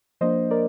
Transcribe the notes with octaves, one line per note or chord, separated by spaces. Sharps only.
F3 A#3 D4 C5 D#5
A#4 D5